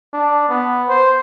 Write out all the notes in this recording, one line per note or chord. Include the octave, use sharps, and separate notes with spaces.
D4
B3
C5